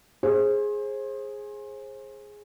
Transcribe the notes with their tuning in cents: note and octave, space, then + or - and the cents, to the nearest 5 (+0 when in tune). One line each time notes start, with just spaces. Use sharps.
G#4 +0 C5 +30